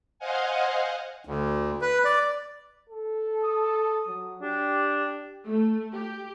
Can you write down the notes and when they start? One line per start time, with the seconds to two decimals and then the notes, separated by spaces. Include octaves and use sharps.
0.19 C5 D#5 F5 F#5 G#5
1.25 D2
1.81 B4
2.05 D5
2.90 A4
3.44 D#6
4.08 F#3
4.42 D4 G4
5.46 A3
5.93 G4